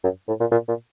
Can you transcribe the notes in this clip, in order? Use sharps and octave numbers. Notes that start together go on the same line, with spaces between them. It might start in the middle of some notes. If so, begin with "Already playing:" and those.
F#2
A2
A#2
A#2
A#2